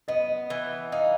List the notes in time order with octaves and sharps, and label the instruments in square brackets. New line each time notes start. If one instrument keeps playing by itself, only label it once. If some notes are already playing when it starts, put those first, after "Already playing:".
[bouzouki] B3 [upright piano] D#5
[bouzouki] E3
[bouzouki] D#4 [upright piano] F5